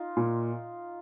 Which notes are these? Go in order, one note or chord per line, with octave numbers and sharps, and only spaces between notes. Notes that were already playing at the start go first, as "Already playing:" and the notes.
Already playing: D#4 F4
A#2